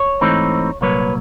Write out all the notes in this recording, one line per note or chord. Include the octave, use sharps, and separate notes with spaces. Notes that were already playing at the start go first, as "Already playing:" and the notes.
Already playing: C#5
G#2 E3 A3 C4 D#4
C2 A#2 F#3 A#3 B4 C#5